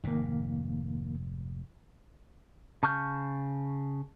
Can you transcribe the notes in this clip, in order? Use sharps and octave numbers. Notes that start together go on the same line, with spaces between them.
F1 G#2 D#3 A#3
C#3 A5 C#6 F6 G6